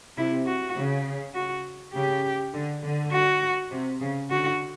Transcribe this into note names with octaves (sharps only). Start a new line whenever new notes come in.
C3 E4
F#4
C#3
F#4
C#3 G4
D3
D3
F#4
C3
C#3
D3 F#4